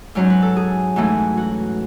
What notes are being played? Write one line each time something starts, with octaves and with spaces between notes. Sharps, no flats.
G#2 F#3 C#4 C#5
B4
A4
G#4
G#2 E3 A3 C#4 F#4
F#4